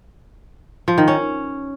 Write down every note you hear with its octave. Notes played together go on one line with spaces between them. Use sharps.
F3
D#3
C#4